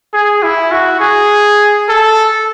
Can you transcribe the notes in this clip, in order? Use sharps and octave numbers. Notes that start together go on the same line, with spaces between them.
G#4
E4
F#4
G#4
A4